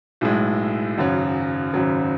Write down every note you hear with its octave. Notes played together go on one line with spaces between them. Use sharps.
B1 A2 G#3
G#1 F#2 C#3 F#3
G#1 F#2 C#3 F#3